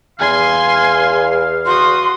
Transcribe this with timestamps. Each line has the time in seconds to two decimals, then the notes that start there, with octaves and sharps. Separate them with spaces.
0.19 E2 F5 G#5 C6
1.66 F#4 C6 D#6